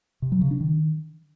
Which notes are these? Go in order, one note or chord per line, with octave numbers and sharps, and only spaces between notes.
C3
F#3
C#3
D4
D#3